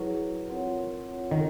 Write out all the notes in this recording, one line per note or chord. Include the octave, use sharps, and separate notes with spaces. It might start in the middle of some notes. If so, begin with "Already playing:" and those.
Already playing: F#3 E4 G#4 B4
C4 F4 A#4 C#5 F#5
D#3